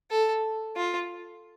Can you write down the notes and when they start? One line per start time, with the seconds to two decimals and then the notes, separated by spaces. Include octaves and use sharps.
0.11 A4
0.76 F4